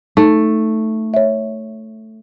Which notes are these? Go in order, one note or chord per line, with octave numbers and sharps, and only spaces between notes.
A3 D#4
C#5 E5